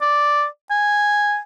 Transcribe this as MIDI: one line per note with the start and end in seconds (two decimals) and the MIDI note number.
0.02 0.45 74
0.71 1.38 80